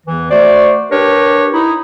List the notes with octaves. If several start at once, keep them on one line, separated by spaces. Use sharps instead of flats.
E2 E3
A3 F#4 C5 D5
D4 G4 A#4 B4 C#5
D#4 E4